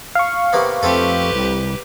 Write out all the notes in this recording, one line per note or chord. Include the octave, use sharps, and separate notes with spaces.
F5 C#6
C3 A#3 B3
F2 A3 C4 G4 A4 B4
C2